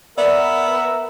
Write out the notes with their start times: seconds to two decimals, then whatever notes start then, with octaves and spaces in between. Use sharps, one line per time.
0.18 B3 A#4 D5 E5